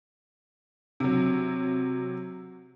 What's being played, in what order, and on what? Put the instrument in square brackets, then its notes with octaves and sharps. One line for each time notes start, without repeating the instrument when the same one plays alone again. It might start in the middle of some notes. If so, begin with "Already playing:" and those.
[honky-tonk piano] C3 F#3